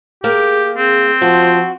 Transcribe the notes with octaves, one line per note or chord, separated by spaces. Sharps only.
A#3 G4 G#4
C4 G#4
F3 F#4 C5